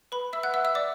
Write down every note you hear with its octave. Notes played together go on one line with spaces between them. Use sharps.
B4 B5
E5 E6
F#5 F#6
E5 E6
E5 E6
D5 D6